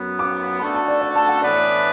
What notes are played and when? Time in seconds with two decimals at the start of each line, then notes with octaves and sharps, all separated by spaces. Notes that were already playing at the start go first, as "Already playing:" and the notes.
Already playing: F#2 F#3 B3
0.19 D6
0.60 A3 D4 F#4 A4 B5
0.74 A5
0.88 D5
1.01 D5
1.15 A5
1.28 F#5
1.42 A2 E3 B3 D4 B4 D5